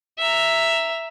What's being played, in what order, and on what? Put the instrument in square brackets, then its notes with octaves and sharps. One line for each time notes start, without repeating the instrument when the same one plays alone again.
[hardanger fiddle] E5 A#5